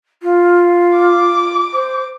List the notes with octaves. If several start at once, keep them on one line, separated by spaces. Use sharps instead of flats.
F4
D6
C5